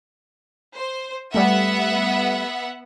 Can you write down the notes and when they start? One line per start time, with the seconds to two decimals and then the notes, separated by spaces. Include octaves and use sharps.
0.76 C5
1.34 G3 A3 B3 E5 F#5